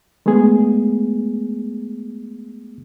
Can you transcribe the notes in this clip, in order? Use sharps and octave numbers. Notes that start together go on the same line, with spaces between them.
G#3 A3 B3 G#4